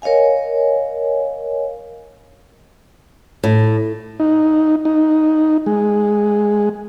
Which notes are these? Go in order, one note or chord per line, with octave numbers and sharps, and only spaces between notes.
A#4 C#5 D#5 F5 G#5
A2
D#4
D#4
G#3